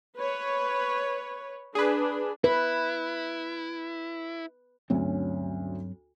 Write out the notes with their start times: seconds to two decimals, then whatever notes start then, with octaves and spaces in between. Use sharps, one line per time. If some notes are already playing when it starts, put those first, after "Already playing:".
0.15 B4 C#5
1.75 D4 G#4 B4
2.44 E4 B4
4.90 D2 G2 F#3 C4 C#4